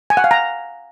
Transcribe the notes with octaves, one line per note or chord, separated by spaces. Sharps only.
G#5
F#5
F5
A#5